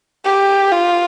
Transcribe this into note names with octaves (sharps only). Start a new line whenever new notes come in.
G4
F4